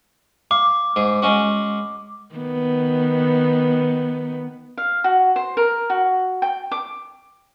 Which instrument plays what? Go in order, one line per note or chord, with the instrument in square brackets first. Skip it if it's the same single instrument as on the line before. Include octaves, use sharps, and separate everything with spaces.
[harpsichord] F5 [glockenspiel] D6
[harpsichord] G#2 G#4
G#3 C#4 F#4
[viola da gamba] D#3 B3
[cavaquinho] F5
F#4
C5
A#4
F#4
G5
D6